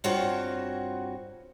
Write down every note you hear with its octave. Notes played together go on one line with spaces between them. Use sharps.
G2 C4 F4 F#4 C#5